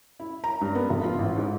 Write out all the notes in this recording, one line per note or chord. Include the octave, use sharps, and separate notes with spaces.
E4
A#5
G2
B3
F1
F4
A1
G#2